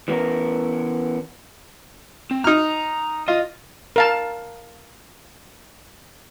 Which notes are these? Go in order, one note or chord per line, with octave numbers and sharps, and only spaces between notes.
E3 G3 B3 C#4 A#4
C4
D#4 A#5 F6
F4 D#5
A#4 F5 A5